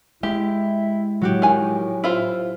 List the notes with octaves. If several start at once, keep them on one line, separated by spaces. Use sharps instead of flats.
G#3 E4 G4
A2 F#3 F#4 G4
D#3 G#5
E4 F4 C5